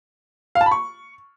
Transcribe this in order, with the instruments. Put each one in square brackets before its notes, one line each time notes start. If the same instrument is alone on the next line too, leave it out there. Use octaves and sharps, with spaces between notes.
[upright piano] F5
A5
B5
C#6